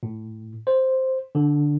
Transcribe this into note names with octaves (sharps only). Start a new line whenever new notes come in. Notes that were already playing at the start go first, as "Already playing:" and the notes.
A2
C5
D3